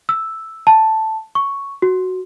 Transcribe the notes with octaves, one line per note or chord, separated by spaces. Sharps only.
E6
A5
C#6
F#4